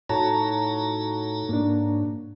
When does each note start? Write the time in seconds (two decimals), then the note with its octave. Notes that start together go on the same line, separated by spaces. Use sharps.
0.09 A2 D#4 E4 F#4 A4 C#5 A5 A#5
1.49 G#2 A#3 D4